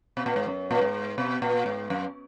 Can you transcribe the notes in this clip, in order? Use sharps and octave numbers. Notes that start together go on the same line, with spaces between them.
B2
A#2
G#2
F#2
A#2
G#2
B2
A#2
G#2
F#2